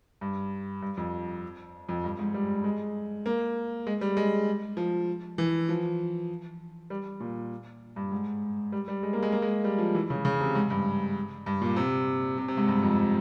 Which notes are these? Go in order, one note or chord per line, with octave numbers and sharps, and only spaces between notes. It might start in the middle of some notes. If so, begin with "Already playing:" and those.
G2
G2
F2
F2
G2
G#2
G3
G#3
A#3
G#3
G3
G#3
F3
E3
F3
G3
A#2
G2
G#2
G3
G3
G#3
A#3
G#3
A#3
G#3
G3
F3
E3
C#3
C#3
C3
G#2
G2
G2
A#2
C3
C3
C3
G#2
G2
F2